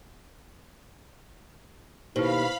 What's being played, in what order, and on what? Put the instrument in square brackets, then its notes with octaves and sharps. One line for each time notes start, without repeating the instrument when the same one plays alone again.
[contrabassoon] D#2 [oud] B2 [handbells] E4 C5 [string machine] F5 B5